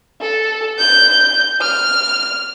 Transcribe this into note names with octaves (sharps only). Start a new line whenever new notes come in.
A4
G6
F6